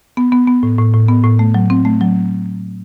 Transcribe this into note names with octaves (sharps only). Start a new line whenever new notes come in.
B3
B3
B3
A2
A2
A2
B3
A2
A3
F#3
C4
A3
F#3